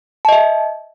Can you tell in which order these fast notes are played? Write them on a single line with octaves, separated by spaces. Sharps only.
A5 D#5 E5